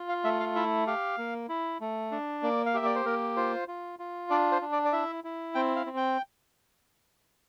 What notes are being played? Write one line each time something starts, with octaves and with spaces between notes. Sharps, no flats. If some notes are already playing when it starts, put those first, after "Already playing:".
Already playing: F4
F5
A3 E5
F5
E4 E5
G4 F5
A#3
E4
A3
D4
A#3 D5
F5
G4 E5
D5
C5
A#3 A#4
F4 C5
F4
F4
D4 D5
C5
D4
D5
D5
E4 E5
E4
C4 G5
F5
C4
G5